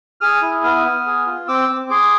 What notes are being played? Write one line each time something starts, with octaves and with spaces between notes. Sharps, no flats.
G#4 D#6 F6
E4
B3 D#6 F6
B3
G#4
F4
C4 D6 E6
C4
G#4 C6 D6